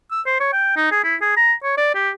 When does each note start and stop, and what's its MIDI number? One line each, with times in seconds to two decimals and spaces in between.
0.11 0.21 88
0.26 0.38 72
0.40 0.52 73
0.53 0.72 79
0.77 0.87 63
0.91 1.02 68
1.04 1.15 64
1.22 1.32 68
1.37 1.53 82
1.63 1.75 73
1.77 1.90 74
1.95 2.10 67